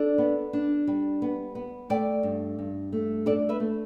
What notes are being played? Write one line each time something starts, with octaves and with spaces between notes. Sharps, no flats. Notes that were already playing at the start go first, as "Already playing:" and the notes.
Already playing: D4 A4 D5
B3
D4
G3
B3
B3
A3 D5 G5
G2
G2
A3
D4 A4 D5
B4 E5
A3